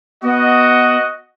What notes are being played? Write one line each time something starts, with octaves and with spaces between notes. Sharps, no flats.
B3 F#4 D#5